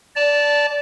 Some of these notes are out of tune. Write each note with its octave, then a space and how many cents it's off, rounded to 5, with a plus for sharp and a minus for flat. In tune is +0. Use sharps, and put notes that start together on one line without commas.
D5 -15 A5 +0